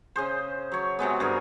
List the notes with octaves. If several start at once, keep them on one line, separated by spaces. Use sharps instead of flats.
C#3 G#4 C5
F#3 C#5
C3 F#3 G#3 B3
G2 G#4 A#4 G#5